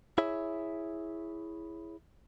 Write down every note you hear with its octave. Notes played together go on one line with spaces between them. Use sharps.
E4 G#4 C#5 E5